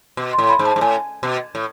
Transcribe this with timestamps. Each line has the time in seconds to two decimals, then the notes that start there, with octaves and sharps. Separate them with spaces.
0.17 B2
0.33 C6
0.38 A2
0.44 C6
0.49 B5
0.59 G#2
0.66 A5
0.76 G#2
0.81 A2 G#5
1.23 B2
1.55 A2